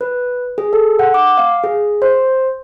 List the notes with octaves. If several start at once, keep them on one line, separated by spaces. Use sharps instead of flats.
B4
G#4
A4
F#5
D6
F5
G#4
C5